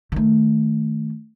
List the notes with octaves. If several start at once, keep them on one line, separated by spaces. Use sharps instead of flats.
D#3 A3